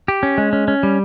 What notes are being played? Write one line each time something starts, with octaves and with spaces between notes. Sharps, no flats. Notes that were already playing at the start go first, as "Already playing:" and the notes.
G4
C#4
G#3
C#4
C#4
G3